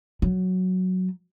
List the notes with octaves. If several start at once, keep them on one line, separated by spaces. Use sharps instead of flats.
F#3